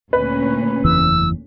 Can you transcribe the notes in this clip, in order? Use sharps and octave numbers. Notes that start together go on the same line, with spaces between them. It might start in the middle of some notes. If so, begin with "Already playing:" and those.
D2 A#2 C#4 B4
F#1 E2 E3 E6